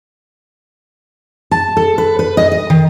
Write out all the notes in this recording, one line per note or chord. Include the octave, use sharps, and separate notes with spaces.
A5
A4
B4
B4
D#5
D#5
D#3